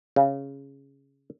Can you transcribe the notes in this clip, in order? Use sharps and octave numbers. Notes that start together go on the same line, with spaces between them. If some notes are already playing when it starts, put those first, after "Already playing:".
C#3